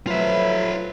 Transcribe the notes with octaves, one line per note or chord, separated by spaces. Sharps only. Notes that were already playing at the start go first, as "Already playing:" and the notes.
F3 F#3 A3 F4 B4 E5